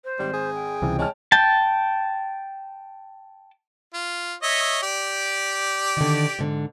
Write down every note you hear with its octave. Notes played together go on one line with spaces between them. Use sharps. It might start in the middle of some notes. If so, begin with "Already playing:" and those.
C5
G#1 G3
G#4
G5
C#2 C3 E3 G3
G#3 C#5 A5 F6
G5 A5
F4
C#5 D#5 E5
G4 D5
D3 D#3
G#2 D3